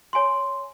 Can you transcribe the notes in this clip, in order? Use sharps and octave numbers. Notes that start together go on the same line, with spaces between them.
C#5 G#5 C6